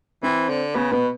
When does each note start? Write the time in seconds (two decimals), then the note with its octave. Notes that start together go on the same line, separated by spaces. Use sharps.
0.23 E3 C4 C5
0.49 D3
0.75 C#3 B3 B4
0.92 B2 B3 B4